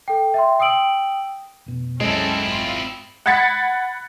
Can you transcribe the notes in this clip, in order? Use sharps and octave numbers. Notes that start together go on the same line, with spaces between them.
A4 G5
E5 G5 C6
G5 D#6 E6 D7 F#7
F1 B2
C2 F#2 G#3 C4 C#4 E4 A4 G5
G#1 F4
F#5 B5 G#6 A6 B6 C#7